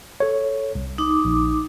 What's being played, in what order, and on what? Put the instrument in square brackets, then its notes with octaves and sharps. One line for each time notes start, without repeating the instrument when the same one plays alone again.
[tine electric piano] A4 C#5
C2
[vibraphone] D#4 D6
[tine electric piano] A#1